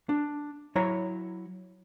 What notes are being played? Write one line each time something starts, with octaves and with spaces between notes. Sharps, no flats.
D4
F#3 E4 C#5 A#5